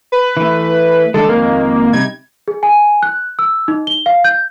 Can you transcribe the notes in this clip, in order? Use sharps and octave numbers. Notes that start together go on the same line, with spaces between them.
B4
E3 A3
D3 D#3 G#3 A4
F2 D#3 G#3 A#3
C3 G3 D#4 G#6
G#4
G#5
F#6
E6
D#4
G7
F5
G6